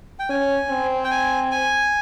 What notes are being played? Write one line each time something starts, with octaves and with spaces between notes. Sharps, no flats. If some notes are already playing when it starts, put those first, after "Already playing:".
G5
C#4 G#5
C4
G5
G#5
G#5